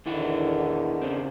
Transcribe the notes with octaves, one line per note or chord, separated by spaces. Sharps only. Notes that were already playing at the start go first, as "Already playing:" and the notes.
E2 A#2 D3 D#3 E4 F#5
C#3 C4